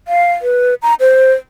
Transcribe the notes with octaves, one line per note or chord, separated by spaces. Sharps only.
F5
B4
A#5
C5